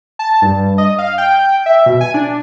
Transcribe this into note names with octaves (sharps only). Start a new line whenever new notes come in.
A5
G2
D#5
F5
G5
E5
B2
G#5
D4